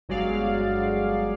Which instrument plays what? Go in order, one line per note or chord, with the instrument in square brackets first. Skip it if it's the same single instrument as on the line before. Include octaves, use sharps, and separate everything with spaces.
[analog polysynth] G1 F#3 G#3 D5 F5